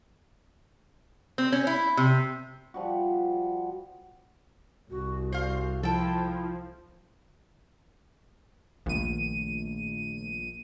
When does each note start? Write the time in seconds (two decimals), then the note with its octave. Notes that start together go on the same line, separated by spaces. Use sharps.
1.38 C4
1.52 C#4
1.67 E4
1.97 C3
2.74 F3 G3 F#4
4.90 C2 F#4
5.32 F#4 C5 F5
5.83 F3 E4 A4 G5
8.86 A#1 D#3 A3 D#7